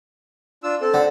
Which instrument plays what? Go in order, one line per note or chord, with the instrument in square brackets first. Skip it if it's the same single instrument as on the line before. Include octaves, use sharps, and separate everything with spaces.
[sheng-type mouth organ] D4 F4 E6
C4 A4
[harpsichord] D3